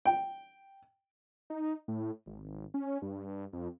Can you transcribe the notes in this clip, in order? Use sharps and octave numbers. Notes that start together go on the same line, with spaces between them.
G5
D#4
A2
G#1
G#1
C#4
G2
F2